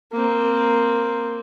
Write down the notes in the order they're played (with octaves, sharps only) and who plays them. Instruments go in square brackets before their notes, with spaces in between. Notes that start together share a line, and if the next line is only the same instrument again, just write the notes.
[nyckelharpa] A#3 C4